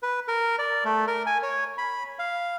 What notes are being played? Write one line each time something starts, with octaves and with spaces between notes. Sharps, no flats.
B4
A#4
D5
A3
A#4
G#5
C#5
B5
F5